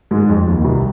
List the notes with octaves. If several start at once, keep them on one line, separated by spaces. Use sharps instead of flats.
G#2 G#3
F2 F3
D#2 D#3
C2 C3